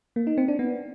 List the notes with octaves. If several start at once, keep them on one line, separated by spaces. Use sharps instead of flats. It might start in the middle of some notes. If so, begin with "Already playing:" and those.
A#3
D#4
C4
D4
B3